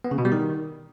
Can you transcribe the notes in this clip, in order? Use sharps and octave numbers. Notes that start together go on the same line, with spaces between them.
B3
C#3
B2
G3
D#3